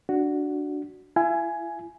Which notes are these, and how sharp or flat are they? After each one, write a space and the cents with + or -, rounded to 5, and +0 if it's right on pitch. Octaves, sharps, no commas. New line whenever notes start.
D4 +0 F#4 +0
E4 +40 G#5 +10